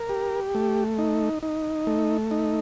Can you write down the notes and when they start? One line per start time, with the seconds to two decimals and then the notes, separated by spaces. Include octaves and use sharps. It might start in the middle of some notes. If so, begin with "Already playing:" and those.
Already playing: A#4
0.09 G4
0.55 A3
0.98 D#4
1.43 D#4
1.87 A3
2.31 D#4